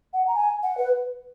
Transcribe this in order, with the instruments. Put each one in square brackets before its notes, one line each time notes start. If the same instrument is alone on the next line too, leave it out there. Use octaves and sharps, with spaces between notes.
[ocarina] F#5
A#5
G#5
F#5
B4